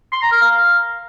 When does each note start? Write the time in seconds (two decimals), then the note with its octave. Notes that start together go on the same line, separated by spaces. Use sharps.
0.12 C6
0.22 A#5
0.32 A#4
0.42 F5